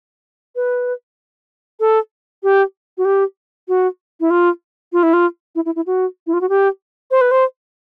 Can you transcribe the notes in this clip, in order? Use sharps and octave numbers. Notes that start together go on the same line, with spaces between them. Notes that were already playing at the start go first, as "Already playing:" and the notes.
B4
A4
G4
F#4
G4
F#4
E4
F4
F4
E4
F4
E4
E4
E4
F#4
E4
F4
F#4
G4
C5
B4
C5